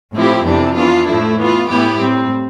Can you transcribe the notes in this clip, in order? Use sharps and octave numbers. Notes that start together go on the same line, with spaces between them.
A2 F3 C4 E4 G4
F2 C3 E3 B3 D4
E3 B3 D4 F4
A2 F3 A3 E4
E3 B3 F4
A2 E3 B3 E4 G4
A2 G3 C4